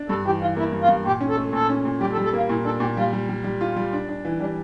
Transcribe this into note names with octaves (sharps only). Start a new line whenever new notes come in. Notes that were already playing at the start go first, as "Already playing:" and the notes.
Already playing: D4
G2 A4
E3 G4
E3 F4
A#3 E4
G2
F4
G2
A#2 G4
C#4
A4
A3
A#2 A4
C#4
A#2
G3 G4
A4
G3
A4
A#3 F4
A#2 E4
D4 A4
A#2 G4
G3 F4
G3
G3
G3
F4
G3
D4
D4
E3
G3 D4